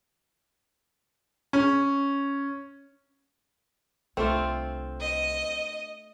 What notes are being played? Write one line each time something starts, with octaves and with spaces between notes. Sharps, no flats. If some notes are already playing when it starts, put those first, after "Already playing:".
C#4
C2 A3 C4 D4 F4
D#5